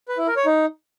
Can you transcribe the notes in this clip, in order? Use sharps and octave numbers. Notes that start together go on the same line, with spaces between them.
B4
E4
A#4
C#5
D#4